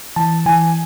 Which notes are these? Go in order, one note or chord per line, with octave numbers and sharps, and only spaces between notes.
E3 A5
E3 G#5